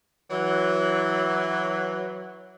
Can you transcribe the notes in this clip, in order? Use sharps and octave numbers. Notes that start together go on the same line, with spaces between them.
E3 F#3